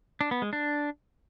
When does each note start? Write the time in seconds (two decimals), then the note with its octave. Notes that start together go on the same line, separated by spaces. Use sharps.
0.21 D4
0.31 B3
0.42 G#3
0.53 D4